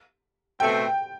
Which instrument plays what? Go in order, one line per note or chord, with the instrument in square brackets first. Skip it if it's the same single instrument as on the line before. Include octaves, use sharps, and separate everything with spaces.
[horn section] B2 A3 C4 [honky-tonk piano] G5